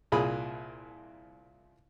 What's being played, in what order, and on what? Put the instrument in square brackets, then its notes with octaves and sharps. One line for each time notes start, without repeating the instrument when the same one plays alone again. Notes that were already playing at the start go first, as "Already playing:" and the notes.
[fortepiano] C2 A#2 G#4 B5